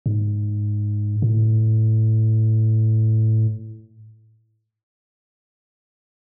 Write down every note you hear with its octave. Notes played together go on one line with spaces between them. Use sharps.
G#2
A#2
A2